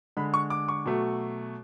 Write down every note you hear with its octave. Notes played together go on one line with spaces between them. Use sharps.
D3 G#3 B5
C#6
D6
C#6
B2 F#3 A3